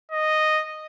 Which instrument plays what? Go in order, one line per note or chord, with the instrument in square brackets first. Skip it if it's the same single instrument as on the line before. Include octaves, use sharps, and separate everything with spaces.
[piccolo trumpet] D#5